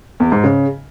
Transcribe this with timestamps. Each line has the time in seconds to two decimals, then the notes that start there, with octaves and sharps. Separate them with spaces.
0.20 E2
0.32 G#2
0.44 C#3